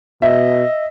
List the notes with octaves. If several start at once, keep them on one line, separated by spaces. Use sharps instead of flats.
B2 D#5 E5